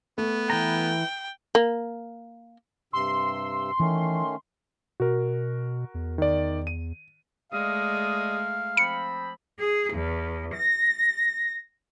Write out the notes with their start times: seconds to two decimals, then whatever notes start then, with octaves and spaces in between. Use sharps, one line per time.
0.18 A3 B3
0.50 E3 G5 A#5
1.55 A#3
2.93 G2 C3 C6 E6
3.80 D#3 E3 A3 C#4
5.00 B2 F#4 A#4
5.94 E2
6.18 D#3 D5
6.67 D#7
7.53 G#3 A3 D5 D#5 F5 D#6
8.77 F3 C4 B5 C#7
9.59 G#4
9.94 E2
10.55 A#6